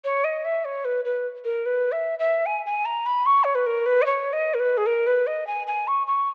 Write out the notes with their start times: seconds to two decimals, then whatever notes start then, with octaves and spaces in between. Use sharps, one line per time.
0.04 C#5
0.24 D#5
0.45 E5
0.65 C#5
0.85 B4
1.05 B4
1.45 A#4
1.66 B4
1.92 E5
2.19 E5
2.46 G#5
2.66 G#5
2.85 A#5
3.06 B5
3.26 C#6
3.44 C#5
3.55 B4
3.66 A#4
3.86 B4
4.02 D#5
4.06 C#5
4.33 D#5
4.54 A#4
4.60 B4
4.77 G#4
4.86 A#4
5.07 B4
5.27 D#5
5.47 G#5
5.67 G#5
5.88 C#6
6.07 C#6